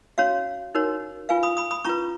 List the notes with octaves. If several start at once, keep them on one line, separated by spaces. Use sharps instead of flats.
C#4 F#4 C#5 F5
D#4 F#4 A#4 C#5
F4 B4 F5 G#5
B5 D#6
B5 D#6
B5 D#6
C#4 F4 B4 A#5 C#6